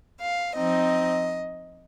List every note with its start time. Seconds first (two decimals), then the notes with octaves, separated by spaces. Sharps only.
0.19 F5
0.56 F3 C4 D#4 D#5